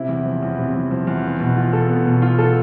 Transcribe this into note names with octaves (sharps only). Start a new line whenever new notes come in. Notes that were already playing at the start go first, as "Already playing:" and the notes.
Already playing: C3 E4
E2
F3
E2
C3
E2
F3
E2
B3
B2
F4
A4
B3
B2
F4
A4